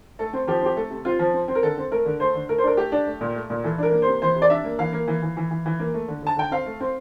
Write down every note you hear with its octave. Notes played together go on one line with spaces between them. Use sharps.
A3 A4
C4
F3 G4
C4 G4
A3 A4
C3
C4 F4
F3
C4
C4
A#4
D3 A4
C4
A3 A#4
D3
A3 C5
D3
A3 A#4
C5
D4 A#4
A3 G4
D4
A3
A#2
A3
A#2
E3 A4
D4 A#4
A#3
C3 C5
E3 C5
C3
D5
D4 E5
A#3
E3 F5
A#3
E3
E3
E3
E3
E3
A#3
A3
D3
D3 A5
D3 G5
C4 F5
A3
C4